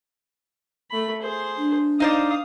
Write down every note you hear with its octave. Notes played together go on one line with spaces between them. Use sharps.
A3 B5
G#4 C5
D4
D#4 C5 D5 F5 D#6